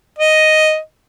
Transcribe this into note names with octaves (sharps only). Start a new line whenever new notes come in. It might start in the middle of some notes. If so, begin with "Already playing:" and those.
D#5